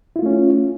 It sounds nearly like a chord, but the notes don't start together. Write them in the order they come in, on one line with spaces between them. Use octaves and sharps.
E4 F4 A3 C#4